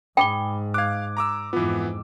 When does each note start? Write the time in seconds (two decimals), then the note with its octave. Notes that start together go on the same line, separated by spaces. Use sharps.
0.17 G#2 G#4 G5 B5 D6 G7
0.74 F5 D6 F#6 G#6
1.17 A#5 D6 E6
1.53 F2 G#2 E3 B3 E4 F4